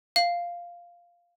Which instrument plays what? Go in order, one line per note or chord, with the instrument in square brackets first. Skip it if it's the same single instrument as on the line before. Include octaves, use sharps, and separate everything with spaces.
[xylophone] F5